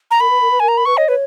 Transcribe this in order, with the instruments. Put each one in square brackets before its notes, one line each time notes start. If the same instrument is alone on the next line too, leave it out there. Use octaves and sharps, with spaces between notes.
[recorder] A#5
[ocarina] A#4 [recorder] B5
[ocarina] B4
A#4
B4
[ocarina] A#4 [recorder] G#5
[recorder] A#5
B5
[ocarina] B4 [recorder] C#6
[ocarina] C#5 [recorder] D#5
[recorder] B4 [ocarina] C#5